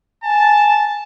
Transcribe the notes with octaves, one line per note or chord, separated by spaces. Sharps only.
G#5 A5